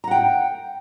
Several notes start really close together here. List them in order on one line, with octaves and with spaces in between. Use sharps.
A#5 F#5 G5